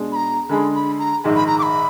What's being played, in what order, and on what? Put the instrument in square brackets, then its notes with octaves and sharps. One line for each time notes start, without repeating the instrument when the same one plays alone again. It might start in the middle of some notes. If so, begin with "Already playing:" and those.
Already playing: [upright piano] B2 G#3 D4 G#4
[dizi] B5
A#5
[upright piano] D3 G#3 D4 G#4 [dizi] B5
[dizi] B5
A#5
[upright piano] A#1 G#2 D#3 G#3
[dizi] B5
A#5
D6
B5